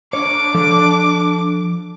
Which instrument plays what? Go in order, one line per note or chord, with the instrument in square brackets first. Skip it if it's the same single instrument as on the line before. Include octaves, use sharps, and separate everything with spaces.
[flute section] D4 [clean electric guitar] C#5 [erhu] D6
[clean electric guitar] F3 A4